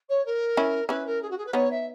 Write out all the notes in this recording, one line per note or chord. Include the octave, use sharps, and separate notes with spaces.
C#5
A#4
C#4 E4
C#4 E4 B4
A#4
G#4
F#4
G#4
B4
B3 D#4 C#5
E5